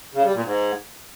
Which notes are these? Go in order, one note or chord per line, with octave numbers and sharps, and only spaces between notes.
C#3
G3
A#2
G#2